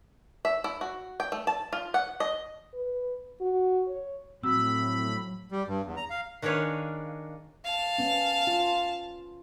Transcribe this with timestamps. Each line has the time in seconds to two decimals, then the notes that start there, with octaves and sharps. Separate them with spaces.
0.45 E5
0.64 E4
0.81 F#4
1.20 G5
1.32 A3
1.47 A5
1.73 F4
1.94 F#5
2.20 D#5
2.74 B4
3.41 F#4
3.88 C#5
4.43 A2 F3 F#3 C4 F#4 B5 E6
5.52 G3
5.67 G2
5.85 E2
5.97 A#5
6.10 F5
6.42 D#3 D4 G#4 B4 C#5 F5
7.64 F5 A5
7.98 B3 C#4
8.47 F4